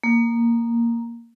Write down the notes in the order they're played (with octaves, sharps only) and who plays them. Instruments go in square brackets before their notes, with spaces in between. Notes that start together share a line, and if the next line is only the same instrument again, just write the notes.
[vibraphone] A#3